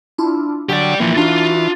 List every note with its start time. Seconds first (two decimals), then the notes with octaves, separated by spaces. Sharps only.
0.18 D4 E4 F4
0.69 D3 F#3 G4 D5 G5
1.00 E3 F3 A#3
1.17 D4 D#4 F4 F#4